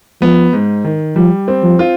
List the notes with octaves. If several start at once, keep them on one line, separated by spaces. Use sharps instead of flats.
F3 B3
G#2
D#3
F3 G3
C4
F3
F4